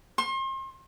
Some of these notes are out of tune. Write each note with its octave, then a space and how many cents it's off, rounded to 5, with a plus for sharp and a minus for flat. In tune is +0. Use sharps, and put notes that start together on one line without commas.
C6 +40